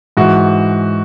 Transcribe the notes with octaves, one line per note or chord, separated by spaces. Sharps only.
G#2 E3 F#4